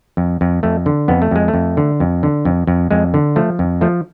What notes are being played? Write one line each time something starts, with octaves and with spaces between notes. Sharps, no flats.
F2
F2
F2 A3
D3
F2 B3
A3
F2 G#3
A3
F2
D3
F2
D3
F2
F2
F2 G#3
D3
F3 A3
F2
F3 A3